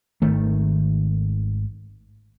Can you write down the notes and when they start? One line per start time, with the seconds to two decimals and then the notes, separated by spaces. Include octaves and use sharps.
0.22 G#1 D#3 A3